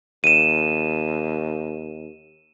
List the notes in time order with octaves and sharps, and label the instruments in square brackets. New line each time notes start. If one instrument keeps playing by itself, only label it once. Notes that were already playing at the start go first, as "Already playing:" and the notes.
[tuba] D#2 [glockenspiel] D#7 E7